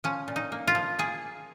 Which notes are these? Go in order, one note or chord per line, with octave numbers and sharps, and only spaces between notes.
F3 C#4
A#2
D#4
A#3
F4
F3
A#3 G#4